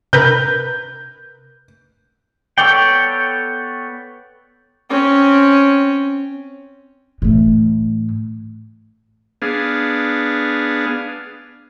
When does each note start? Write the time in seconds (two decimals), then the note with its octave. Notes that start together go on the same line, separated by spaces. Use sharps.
0.13 C3 A#4 B4 G6
2.58 B3 A4 C#5 D5 G5
4.90 C4 C#4
7.22 A2 E3
9.42 B3 D4 G#4 F5